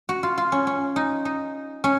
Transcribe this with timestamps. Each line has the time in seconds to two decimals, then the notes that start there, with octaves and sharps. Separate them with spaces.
0.09 F#4
0.23 F4
0.38 F4
0.52 C#4
0.67 C#4
0.96 D#4
1.25 D#4
1.84 C#4